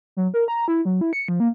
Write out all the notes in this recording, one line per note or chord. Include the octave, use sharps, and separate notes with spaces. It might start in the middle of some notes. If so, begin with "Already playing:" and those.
F#3
A#4
A#5
E4
F#3
E4
C#7
F3
A#3